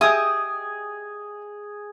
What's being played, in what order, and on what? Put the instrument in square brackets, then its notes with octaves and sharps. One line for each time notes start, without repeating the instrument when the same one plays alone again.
[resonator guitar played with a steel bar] G4 D#5 E5 [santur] G#4 G#5 [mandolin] D#6